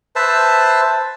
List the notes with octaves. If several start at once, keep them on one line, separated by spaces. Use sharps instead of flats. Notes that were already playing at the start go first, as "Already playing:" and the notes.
B4 C5 E5 A5